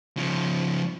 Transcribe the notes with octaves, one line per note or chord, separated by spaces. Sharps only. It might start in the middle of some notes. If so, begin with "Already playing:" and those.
C#3 F3